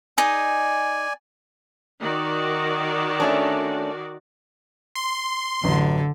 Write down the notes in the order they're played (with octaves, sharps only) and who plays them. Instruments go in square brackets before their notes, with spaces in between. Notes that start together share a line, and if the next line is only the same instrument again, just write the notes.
[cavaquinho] D#4 G#4 [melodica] D5 G#5
[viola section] D#3 F#4 D5
[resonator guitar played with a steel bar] A3 C#4 D4
[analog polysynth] C6
[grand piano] A1 F#2 [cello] D3